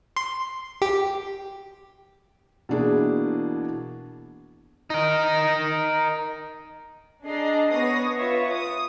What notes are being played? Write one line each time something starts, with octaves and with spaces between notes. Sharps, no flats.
C6
G4
B2 E3 A#3 D4 E4 G#4
D#4 A#4
D4 G#4 D#5 A#5 C7
B3 C#5 D#6 A#6 C7
F4 B4 C#5 E5
D#6